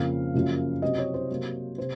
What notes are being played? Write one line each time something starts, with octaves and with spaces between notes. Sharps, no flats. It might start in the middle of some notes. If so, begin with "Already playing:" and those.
Already playing: F2 C#3 F3 A#3 F5
F#2 C#3 F3 A#3
C3 F#3 C4 D#5
C#5
C5
C3 F#3 A#3
C3 C5